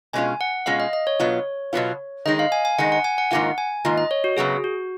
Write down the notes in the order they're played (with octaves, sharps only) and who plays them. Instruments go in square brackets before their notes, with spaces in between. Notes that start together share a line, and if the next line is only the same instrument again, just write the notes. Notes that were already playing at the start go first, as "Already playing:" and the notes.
[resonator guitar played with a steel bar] B2 G#3 C#4 F4 [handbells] G#5
[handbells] F#5
[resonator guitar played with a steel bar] B2 G#3 C#4 F4 [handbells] F5
[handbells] D#5
D#5
C#5
[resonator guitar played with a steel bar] B2 F#3 B3 F4
B2 F#3 B3 F4
[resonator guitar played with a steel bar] D#3 G#3 D#4 [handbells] D#5
[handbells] F5
G#5
G#5
[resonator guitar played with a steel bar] D#3 G#3 D#4 [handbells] F#5
[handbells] F#5
G#5
F#5
[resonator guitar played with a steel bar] G#2 D#3 A#3 F4 [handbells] F#5
[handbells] G#5
[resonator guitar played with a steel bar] G#2 D#3 A#3 F4
[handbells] D#5
C#5
F#4
[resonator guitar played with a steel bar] F#2 C#3 F#3 B3 [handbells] G#4
[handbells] F#4